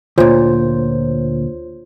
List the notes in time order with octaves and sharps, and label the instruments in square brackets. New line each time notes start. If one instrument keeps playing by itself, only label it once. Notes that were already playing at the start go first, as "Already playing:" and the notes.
[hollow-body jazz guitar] D2 A#2 [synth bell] F4 C5 C#5